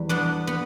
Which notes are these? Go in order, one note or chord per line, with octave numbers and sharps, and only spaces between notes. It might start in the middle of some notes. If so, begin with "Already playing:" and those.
Already playing: E2 G3
B3 D4
B3